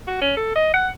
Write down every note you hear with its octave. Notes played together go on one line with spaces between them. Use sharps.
F#4
C#4
A4
D#5
F#5